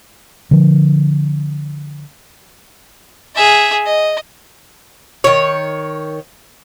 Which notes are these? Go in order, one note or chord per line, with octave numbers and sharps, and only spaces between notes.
D3 F3
G#4 E5
D#5
D#3 C#5